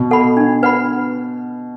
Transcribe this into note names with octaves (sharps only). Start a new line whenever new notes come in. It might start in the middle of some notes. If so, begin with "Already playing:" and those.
Already playing: B2
A4 F#5 B5
D4
B4 F#5 B5